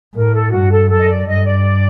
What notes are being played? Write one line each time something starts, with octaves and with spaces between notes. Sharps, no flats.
A2 A#4
A4
G2 F#4
A4
F#2 A4
D#5
D5
G2 D#5
D5